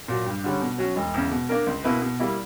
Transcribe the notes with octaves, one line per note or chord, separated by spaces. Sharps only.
A#2 F#3
G2
D3 G3 C#4
B2
F#3 C#4
E1
E2 C#3
B2
A#3 D4 A#4
C#2
B2 A#3 E4 B4
B2
G3 A#3 E4